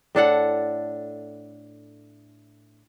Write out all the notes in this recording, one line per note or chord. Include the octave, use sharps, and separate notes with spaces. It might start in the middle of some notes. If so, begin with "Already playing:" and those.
A2 D4 A4 F#5